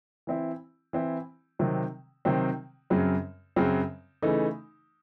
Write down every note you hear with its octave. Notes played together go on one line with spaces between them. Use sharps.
E3 C4 E4
E3 C4 E4
C3 D#3 F#3 C4
C3 D#3 F#3 C4
F#2 C#3 F#3 C4
F#2 C#3 F#3 C4
C#3 E3 A3 D#4